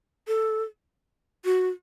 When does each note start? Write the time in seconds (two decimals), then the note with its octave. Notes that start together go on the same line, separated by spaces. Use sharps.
0.28 A4
1.45 F#4